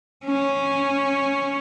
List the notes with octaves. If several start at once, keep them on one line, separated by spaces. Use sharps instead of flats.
C#4